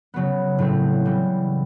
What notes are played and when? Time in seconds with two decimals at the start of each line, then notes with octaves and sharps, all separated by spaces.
0.14 C#3 F#3 B3
0.59 A2 F#3 A3 C4
1.05 C#3 E3 G3